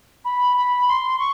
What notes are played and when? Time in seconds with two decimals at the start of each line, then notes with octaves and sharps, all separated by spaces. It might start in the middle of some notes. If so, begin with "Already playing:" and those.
0.24 B5
0.57 B5
0.87 C6
1.18 C#6